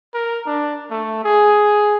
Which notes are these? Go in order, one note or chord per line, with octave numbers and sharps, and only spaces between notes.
A#4
D4
A3
G#4